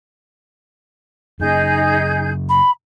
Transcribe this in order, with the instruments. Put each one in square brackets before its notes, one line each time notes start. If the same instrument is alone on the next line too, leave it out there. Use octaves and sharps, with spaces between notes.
[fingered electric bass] F#2 C#3 [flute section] D#4 G#4 G6
[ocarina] B5